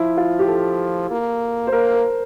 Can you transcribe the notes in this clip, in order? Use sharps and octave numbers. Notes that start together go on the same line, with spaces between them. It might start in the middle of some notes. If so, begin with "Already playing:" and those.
Already playing: F3 E4
F4
G4
A4
A#3
C5
A#3 A#4
A#4